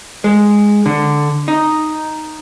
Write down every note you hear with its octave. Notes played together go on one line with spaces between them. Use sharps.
G#3
D3
D#4